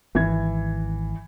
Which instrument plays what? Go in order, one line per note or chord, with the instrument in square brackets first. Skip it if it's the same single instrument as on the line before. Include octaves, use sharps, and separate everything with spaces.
[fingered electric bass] G#1 [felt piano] E3 G#6